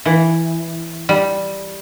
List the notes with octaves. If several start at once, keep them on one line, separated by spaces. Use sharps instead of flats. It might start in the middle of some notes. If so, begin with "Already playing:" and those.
E3
G3